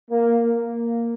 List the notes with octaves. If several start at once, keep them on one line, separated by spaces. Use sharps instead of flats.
A#3
A#3